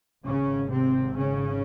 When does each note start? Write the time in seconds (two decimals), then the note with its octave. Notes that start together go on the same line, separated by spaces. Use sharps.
0.24 G#1 G#2 C#3 C#4
0.71 C3 C4
1.17 C#3 C#4